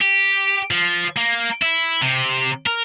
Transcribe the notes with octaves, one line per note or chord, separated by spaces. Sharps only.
G4
F3
A#3
E4
C3
A#4